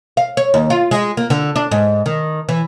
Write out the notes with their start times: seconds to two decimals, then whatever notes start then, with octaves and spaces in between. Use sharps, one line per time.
0.17 F5
0.37 C#5
0.54 D#2
0.70 F4
0.91 G#3
1.17 A#3
1.30 D3
1.56 D4
1.72 G#2
2.06 D#3
2.49 E3